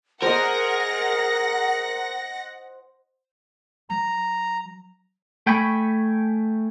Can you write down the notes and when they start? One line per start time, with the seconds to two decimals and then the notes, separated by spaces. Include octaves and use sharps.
0.22 G#4 A#4 C5 D#5 F#5 A#6
3.90 F#3 A#5
5.46 A3 G5 G#5 B5 C#6